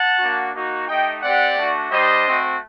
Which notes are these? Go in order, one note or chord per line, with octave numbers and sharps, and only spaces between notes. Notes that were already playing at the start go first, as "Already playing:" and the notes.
Already playing: F#5 A5
A#3 D4 F#4
A#3 D#4 F#4
A3 D#4 G4 D#5 G5
C4 G4 D5 F#5
A3 D4 F#4
G3 D4 G4 C5 D#5
A3 C4 F#4